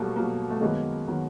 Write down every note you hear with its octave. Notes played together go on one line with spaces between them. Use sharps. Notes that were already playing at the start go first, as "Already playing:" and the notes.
Already playing: B2 F#3 G3 A3 A#3
B2 F#3 A#3
A3
F#2 D#3 F#3 G#3 A#3 B3
D#3 F#3 B3